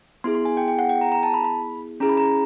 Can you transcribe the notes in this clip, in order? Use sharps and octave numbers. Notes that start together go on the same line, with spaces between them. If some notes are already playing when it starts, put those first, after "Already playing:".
B3 E4 G#4 C6
C6
G#5
G5
G5
F#5
G5
A#5
A#5
A5
B5
B5
C#4 E4 G#4 A#5
B5
A#5